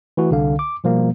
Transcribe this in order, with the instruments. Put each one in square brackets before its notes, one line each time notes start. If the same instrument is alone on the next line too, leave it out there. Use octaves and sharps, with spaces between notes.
[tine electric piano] E3 A3 F#4
C2 D3 F5
D6
B2 F3 G3 A#3